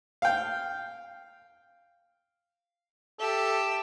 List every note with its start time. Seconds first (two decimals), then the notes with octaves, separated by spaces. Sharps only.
0.22 F5 G5
3.20 G4 A4 E5